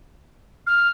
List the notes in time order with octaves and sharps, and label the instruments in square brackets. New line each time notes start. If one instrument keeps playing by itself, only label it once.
[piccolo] F6